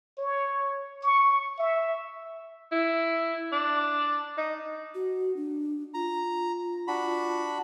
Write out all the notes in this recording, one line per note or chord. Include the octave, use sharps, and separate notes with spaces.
C#5
C#6
E5
E4
D4
D#4
F#4
D4
F4 A#5
D4 F#4 B5